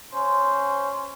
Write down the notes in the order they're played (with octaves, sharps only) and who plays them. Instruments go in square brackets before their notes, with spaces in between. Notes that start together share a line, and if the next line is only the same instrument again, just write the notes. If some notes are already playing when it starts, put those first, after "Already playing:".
[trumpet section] C#4 C5